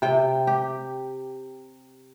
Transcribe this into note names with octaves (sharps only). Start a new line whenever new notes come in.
C3 G5
G4